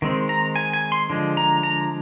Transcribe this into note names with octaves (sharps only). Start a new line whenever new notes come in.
D#3 G#3 C4
A#5
G#5
G#5
C6
D3 F3 G#3
A#5
A#5